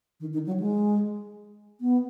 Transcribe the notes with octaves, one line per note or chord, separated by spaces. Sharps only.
D#3
D#3
F#3
G#3
B3